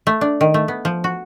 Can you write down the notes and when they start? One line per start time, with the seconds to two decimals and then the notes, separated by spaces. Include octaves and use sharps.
0.07 A3
0.21 D4
0.41 D#3
0.54 A3
0.68 B3
0.85 F3
1.04 F#4